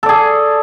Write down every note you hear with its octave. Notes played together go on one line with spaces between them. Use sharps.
G#4 A4 D5